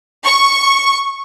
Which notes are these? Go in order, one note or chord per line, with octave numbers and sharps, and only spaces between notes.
C#6